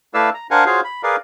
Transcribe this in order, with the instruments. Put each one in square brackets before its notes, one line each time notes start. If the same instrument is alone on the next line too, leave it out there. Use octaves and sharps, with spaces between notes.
[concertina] A3 E4 B4 D5 F5 E6
A#5
D4 A#4 C5 F5 F#5 G#5
F4 F#4 G#4 C5 C#5 F5
B5
G#4 A#4 B4 D5 F5